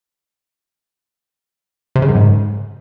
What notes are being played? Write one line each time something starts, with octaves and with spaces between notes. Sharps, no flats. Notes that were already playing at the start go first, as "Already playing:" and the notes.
C3
C#3
F#2
G#2